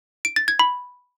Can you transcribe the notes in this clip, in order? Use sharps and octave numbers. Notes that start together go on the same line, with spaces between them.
D7
A6
G#6
B5